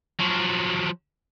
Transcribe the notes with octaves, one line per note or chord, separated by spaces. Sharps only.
F3 F#3